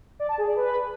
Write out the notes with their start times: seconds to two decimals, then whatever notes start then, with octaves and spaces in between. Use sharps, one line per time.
0.20 D5
0.29 A5
0.38 G#4
0.47 D5
0.56 B4